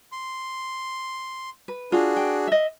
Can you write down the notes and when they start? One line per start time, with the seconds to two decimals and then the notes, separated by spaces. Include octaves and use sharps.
0.12 C6
1.68 B4
1.92 D4 F4 F#4 G#4
2.17 G5
2.47 D#5 E5